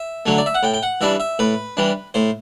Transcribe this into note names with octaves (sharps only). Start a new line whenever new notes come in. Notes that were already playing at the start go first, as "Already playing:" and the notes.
Already playing: E5
D3 F#3 A3
D5
E5
F#5
A2 G5
G5
F#5
E3 G3 D4 E5
E5
A2 B4
E3 G3 D4
A2 C5